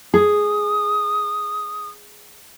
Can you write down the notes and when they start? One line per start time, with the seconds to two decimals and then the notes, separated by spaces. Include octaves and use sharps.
0.14 G#4 D#6